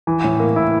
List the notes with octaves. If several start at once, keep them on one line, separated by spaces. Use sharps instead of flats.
E3
A2
A#3
E4